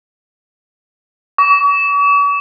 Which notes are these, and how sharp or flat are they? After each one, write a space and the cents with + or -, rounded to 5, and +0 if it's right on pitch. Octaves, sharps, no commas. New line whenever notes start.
C#6 +45